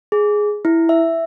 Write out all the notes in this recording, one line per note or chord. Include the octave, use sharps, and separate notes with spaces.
G#4
E4
E5